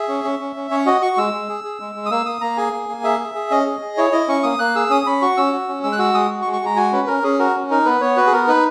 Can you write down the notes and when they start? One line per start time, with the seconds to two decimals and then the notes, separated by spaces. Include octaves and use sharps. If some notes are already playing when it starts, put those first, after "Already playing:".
Already playing: G#4 E5
0.08 C#4
0.24 C#4
0.39 C#4
0.56 C#4
0.71 C#4 C#5
0.86 F#4 D#5
1.01 F#4 C#6
1.17 G#3 E6
1.34 G#3
1.49 G#4
1.64 G#4
1.80 G#3
1.95 G#3
2.06 D#6
2.11 A#3 E6
2.26 A#3 D#6
2.41 A#3 A#5
2.57 G#4 G#5
2.73 A#3
2.89 A#3
3.04 G#4 E5
3.20 G#4
3.35 G#4
3.51 C#4 D#5
3.67 G#4
3.82 G#4
3.97 E4 C#5
4.12 E4 D#5
4.28 C#4 C#6
4.43 A#3 D#6
4.59 A#3 F#6
4.75 G#4 E6
4.90 C#4 D#6
5.06 C#4 B5
5.22 F#4 C#6
5.37 C#4 E6
5.53 F#4
5.69 C#4
5.83 G#3 E6
5.92 F#6
5.99 F#4 E6
6.14 G#3 D#6
6.31 F#4
6.42 C#6
6.45 G#3
6.53 C#6
6.61 G#3 A#5
6.76 F#4 G#5
6.92 C#4 B4
7.07 C#4 A#4
7.23 C#4 G#4
7.39 F#4 A#4
7.55 C#4
7.70 D#4 A#4
7.85 B3 B4
8.01 B3 C#5
8.16 F#4 B4
8.27 G#4
8.32 B3 A#4
8.48 D#4 B4